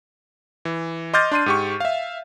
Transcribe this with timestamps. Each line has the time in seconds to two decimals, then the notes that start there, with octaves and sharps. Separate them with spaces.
0.65 E3
1.13 D#5 C6 D6 F6 G6 A6
1.32 D4 C6 D#7
1.46 G#2 G4 C#6
1.80 E5 F5